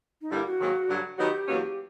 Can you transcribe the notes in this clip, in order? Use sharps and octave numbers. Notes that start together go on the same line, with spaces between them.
D#4
G2 D3 G3 A#3 E4
F#4
G#2 D#3 F#3 A#3
G2 D3 F#3
D#3 F#3 B3 D#4 F#4 G4
E2 B2 F#3 A#3 C#4